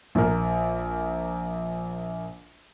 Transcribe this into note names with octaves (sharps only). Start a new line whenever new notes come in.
A#1 A#4